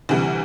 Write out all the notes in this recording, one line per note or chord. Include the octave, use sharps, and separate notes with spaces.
D2 C3 E3 G3